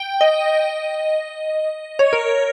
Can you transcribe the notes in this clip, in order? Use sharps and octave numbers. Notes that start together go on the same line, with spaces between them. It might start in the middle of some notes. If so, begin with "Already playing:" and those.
Already playing: G5
D#5
C#5
A#4